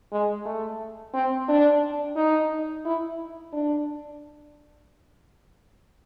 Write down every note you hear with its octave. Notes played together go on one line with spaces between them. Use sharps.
G#3
A3
C4
D4
D#4
E4
D4